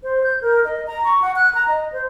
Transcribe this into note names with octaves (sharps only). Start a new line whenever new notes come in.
C5
G6
A#4
D#5
A#5
C#6
F#5
F#6
A#5
D#5
C5